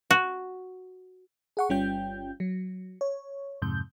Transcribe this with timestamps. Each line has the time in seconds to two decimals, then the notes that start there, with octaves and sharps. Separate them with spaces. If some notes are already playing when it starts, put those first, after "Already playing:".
0.11 F#4
1.57 G#4 F#5 C#6
1.69 G1 G3 C#4 F4 G5 G6
2.40 F#3
3.01 C#5
3.62 F2 G#2 C3 G6